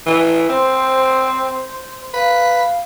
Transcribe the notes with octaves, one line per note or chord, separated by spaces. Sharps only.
E3
C4 C5
B4 F5